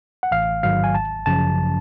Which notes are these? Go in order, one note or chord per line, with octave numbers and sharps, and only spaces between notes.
F#5
A1 F5
G#2 D#3 F#3 F5
G#5
G#1 A5
F#2 C#3 F3 A5